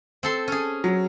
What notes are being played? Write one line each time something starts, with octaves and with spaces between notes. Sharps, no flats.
C4 A4 C6
C#4 G#4
F#3